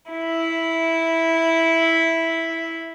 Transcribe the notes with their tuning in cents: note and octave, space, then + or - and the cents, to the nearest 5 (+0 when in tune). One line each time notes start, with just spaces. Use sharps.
E4 -5